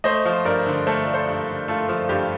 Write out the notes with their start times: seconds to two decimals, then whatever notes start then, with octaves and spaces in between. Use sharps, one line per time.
0.04 A3 C5 D#5
0.25 F3
0.45 G2 A#4 D5
0.67 D3
0.87 A3 A4 C5
1.05 F3 D5
1.14 A4 C5
1.27 G2
1.47 D3
1.68 A3 F4 A4
1.89 F3
2.09 G2 G4